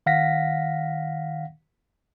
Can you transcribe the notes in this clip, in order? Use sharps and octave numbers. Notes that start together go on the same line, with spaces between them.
D#3 F5 F#5 A#6 B6